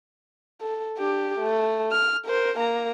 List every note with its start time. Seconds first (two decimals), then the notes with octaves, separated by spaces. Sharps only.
0.61 A4
0.98 D4 G4
1.39 A3
1.91 F6
2.26 A#4 C5
2.58 A#3 A#5